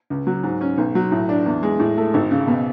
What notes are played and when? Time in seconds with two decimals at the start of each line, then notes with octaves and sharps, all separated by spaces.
0.10 C#2
0.27 F#3
0.44 G#2
0.61 C#4
0.77 B1
0.95 F#3
1.12 A2
1.29 D4
1.46 E2
1.63 G#3
1.79 A2
1.97 A3
2.14 G#1
2.31 C#3
2.47 B2